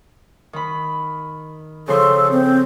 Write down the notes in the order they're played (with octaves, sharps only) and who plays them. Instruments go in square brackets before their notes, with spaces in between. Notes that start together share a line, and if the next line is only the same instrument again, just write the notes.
[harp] D#3 B5
[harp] C#3 F3 C6 [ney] A4
[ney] C4